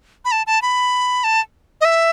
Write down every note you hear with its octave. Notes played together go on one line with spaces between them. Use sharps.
B5
A5
A5
B5
A5
D#5
E5